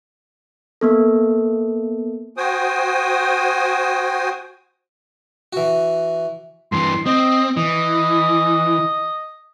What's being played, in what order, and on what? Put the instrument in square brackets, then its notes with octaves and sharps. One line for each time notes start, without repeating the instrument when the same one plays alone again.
[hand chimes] A#3 B3 A4
[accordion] F#4 C5 G5 G#5 D#6
[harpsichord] E3 F#4
[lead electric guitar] G2 E3 [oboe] C6
[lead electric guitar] C4 [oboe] D#5
[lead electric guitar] E3 [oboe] D#5